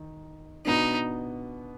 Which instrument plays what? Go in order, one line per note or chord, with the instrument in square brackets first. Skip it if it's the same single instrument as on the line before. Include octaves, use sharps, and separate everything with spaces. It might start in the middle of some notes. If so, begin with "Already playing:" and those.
Already playing: [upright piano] D#3
[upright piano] B2 B3 D4 [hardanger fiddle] D#4